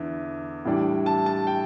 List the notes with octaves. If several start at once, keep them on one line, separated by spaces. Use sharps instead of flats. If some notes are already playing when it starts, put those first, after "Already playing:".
Already playing: E2 D3 E4
A2 E3 G3 D4
A5
A5
G5